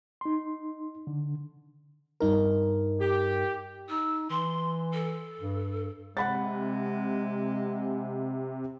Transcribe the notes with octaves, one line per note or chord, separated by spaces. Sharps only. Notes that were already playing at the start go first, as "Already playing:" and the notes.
D#4 C6
D3
G2 D#4 A#4
G4
D#4 E6
E3 C6
A4
G2
C3 G#3 F#5 B5 A6